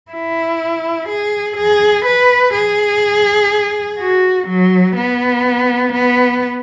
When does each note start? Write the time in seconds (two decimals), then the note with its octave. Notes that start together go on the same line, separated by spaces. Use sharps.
0.11 E4
1.09 G#4
1.57 G#4
2.06 B4
2.54 G#4
3.99 F#4
4.48 F#3
4.97 B3
5.93 B3